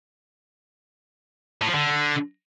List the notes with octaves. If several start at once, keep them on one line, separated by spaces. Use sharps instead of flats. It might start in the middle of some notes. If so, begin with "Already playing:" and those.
A2
F3
D3